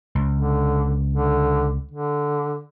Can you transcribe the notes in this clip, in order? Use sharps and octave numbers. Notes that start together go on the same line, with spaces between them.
C#2
D3
D3
D3